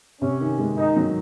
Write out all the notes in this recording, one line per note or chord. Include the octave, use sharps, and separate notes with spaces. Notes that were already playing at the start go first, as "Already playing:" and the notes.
C3 C#4
D#3
G#3
D#3 D#4
F#3